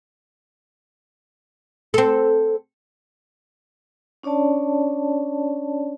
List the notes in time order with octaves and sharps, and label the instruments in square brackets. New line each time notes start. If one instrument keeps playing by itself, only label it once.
[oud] C4 A4
[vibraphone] C#4 D4 C#5 D5 A5